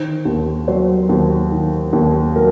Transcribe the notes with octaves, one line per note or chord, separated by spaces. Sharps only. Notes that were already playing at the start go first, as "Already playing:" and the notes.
Already playing: D#3 C5
D#2
F#3 C5
D#2
D#3
D#2
F#3 A#4